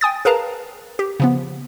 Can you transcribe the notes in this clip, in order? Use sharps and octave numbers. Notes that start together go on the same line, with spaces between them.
G5 G#5 D#6 A6
G#4 A#4 B4 F5 A5 A#5
G4
C#3 F3 B3